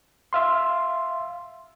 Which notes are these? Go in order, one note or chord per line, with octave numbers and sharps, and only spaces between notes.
E5 F5 C6